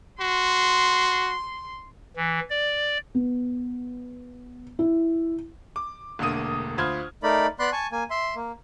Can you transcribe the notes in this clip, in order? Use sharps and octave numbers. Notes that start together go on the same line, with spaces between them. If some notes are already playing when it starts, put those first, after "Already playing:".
F#4 C6
E3
D5
B3
E4
D6
E1 D3 A3 A#3 D#6 D#7
D2 F4 C5 B5 F6 G#6
A3 D#4 A#4 D5 B5
B3 D5 B5 C6 F#6
G#5 A5 C#6
A#3 G#5
E5 C6
A#3